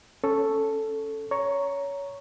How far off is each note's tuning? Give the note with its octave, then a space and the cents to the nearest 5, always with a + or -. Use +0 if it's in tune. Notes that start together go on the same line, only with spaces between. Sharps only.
C#4 +0 A4 +0 C#6 +0
C#5 +20 A#5 +0 C#6 +0